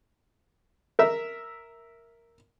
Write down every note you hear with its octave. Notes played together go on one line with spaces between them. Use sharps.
A#4 E5